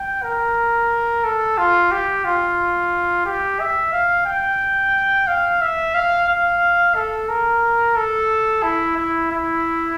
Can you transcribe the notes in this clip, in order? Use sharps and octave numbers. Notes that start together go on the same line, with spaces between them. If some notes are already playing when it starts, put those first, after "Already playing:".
Already playing: G5
A#4
A4
F4
G4
F4
G4
E5
F5
G5
F5
E5
F5
F5
A4
A#4
A4
E4
E4
E4